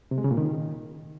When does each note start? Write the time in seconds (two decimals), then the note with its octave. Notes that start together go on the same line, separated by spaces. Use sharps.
0.11 C3
0.18 G#3
0.24 C#3
0.31 A#2
0.37 D#3